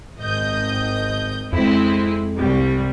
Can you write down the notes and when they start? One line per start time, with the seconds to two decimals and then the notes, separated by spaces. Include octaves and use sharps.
0.18 G#1 D#5 G6
1.53 F2 G#3 C4 E4
2.37 C2 G3